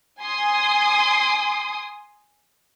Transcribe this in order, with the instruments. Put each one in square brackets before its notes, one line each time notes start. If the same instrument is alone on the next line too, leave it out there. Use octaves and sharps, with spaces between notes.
[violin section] G#5 C6 D#6